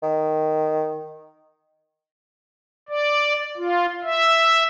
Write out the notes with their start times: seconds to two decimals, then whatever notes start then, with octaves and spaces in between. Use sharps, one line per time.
0.03 D#3
2.89 D5
3.57 F4
4.03 E5